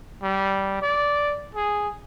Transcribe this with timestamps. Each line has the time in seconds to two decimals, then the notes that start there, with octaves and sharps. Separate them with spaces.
0.22 G3
0.82 D5
1.55 G#4